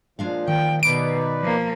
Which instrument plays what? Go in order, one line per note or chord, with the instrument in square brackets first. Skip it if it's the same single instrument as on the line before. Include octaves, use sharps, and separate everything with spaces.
[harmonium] A#2 F3 [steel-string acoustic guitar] G#3 D4 F5
[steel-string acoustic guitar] D#3 [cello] G5
[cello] B2 [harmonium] D#4 B4 D5 [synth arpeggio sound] D7
[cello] F3 A#3